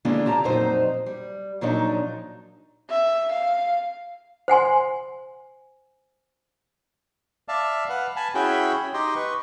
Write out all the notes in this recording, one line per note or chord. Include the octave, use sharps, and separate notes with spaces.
D3 E3 G#3 A#3 D4 F4
A2 G4 A5 A#5
F2 A#2 F#3 D#4 C5
G3
A#2 F3 F#3 D4 D#4
E5
F5
C5 F#5 G#5 C6
D5 E5 F5 A5
B4 F5 F#5
G#5 A5 B5
C#4 E4 F#4 G#4 G5 B5
D#4 G4 D#5 G5 C6
B4 C#6